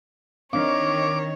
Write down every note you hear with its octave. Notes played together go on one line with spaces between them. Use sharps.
D#3 C4 D4 C#5 F5 D6